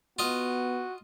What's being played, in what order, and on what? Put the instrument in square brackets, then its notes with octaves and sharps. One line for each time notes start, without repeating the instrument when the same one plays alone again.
[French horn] B3 [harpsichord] F4 D#5 [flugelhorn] F#4